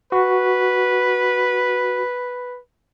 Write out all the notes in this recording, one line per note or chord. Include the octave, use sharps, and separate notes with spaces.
F#4 B4